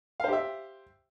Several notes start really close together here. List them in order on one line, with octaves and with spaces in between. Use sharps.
F5 C5 G4 E5